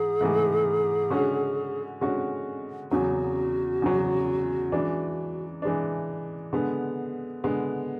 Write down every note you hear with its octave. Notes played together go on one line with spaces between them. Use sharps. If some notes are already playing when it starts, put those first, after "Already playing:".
Already playing: G#2 E3 G#4
G#2 E3 A3
D3 G#3 C#4 F#4
D3 G#3 C#4 F#4
E2 C#3 F#3 F#4
E2 C#3 F#3
E3 G#3 D4
E3 G#3 D4
D3 G#3 B3
D3 G#3 B3